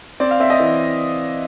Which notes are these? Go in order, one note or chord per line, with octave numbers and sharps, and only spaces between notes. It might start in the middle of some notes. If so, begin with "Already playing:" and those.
C4 D5
F5
C4 E5
D#5
E3